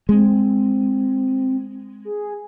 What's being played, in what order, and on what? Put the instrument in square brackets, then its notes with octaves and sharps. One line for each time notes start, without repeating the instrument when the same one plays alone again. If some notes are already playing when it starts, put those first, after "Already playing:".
[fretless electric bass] G#3 [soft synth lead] C4
[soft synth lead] G#4